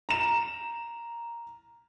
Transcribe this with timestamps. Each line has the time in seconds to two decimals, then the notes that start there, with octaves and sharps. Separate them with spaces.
0.09 A#5 E7